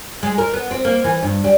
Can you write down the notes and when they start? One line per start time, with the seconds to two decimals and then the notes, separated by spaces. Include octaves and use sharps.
0.23 G#3
0.38 A#4
0.54 B3
0.71 C4
0.85 A#3
1.04 E3
1.23 G2
1.44 G3